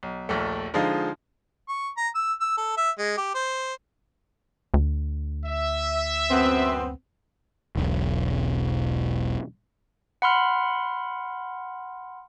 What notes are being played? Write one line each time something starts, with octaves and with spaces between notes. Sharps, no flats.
B1
A#1 D#2 A3
D3 F3 G#3 D#4 F4
C#6
A#5
E6
E6
A4
E5
G#3
G4
C5
D2
E5
F#2 B3 C4
E1 B1
F#5 B5 C6 F6